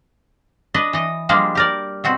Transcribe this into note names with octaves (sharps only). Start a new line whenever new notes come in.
D4 B4 D#5
E3 D#5
F3 G3 G#3 A#3 D4
G4 A#4 D5
B2 C4 F#4